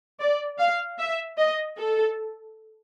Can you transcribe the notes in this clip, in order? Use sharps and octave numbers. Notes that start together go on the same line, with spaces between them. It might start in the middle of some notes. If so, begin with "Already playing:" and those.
D5
F5
E5
D#5
A4